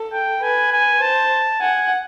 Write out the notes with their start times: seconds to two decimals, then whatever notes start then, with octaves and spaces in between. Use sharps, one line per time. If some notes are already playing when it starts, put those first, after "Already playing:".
Already playing: A4
0.13 G5
0.42 B4 G#5
0.72 G#5
1.02 C5 A5
1.61 F#5 G#5